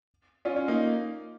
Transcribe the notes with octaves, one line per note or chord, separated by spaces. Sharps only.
C#4 F4
C#4
A#3 D#4